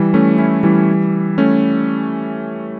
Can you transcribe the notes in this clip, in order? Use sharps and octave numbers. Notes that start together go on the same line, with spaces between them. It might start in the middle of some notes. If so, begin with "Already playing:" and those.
Already playing: E3 G3
A3 C#4
C#4 E4
E3 G3
A3 C#4